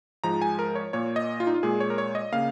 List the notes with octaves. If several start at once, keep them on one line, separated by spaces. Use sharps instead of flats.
G#2 F3 G#3 A#5
G#5
A#4
C#5
A#2 A#3 C#5
D#5
F4
D#4
F4
A#2 G#3 G#4
C#5
A#4
C#5
D#5
C#3 A#3 F5